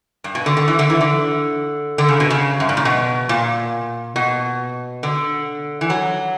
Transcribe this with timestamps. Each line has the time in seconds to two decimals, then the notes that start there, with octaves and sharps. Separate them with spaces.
0.24 G2
0.35 B2
0.46 D3
0.57 D3
0.68 E3
0.79 D3
0.90 E3
1.01 D3
1.98 D3
2.09 C#3
2.20 B2
2.30 C#3
2.60 F#2
2.69 G2
2.77 A#2
2.85 B2
3.29 A#2
4.16 B2
5.03 D3
5.81 E3
5.90 F#3